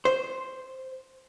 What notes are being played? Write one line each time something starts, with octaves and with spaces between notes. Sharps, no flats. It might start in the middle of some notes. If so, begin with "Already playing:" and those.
C5